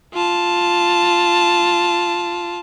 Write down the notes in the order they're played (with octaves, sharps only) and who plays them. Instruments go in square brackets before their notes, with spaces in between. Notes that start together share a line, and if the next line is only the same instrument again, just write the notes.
[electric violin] F4 A5